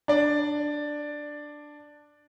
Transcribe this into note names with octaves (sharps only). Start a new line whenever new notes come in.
D4 D5